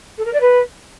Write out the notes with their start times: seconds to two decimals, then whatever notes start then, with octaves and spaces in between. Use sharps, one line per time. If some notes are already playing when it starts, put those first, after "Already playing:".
0.17 A4
0.25 A#4
0.33 D5
0.40 B4